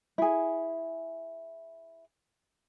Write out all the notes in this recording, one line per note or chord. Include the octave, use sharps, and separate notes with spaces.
E4 G#4